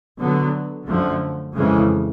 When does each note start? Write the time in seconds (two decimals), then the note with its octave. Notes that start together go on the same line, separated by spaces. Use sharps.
0.18 D3 F#3 B3
0.87 F#2 D3 F3 A3
1.55 F2 C#3 E3 G#3